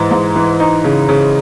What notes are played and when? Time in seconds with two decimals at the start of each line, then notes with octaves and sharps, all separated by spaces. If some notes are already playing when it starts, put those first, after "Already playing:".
Already playing: G#2 E3
0.11 G#2
0.36 E3
0.60 D#4
0.84 C#3
1.09 C#3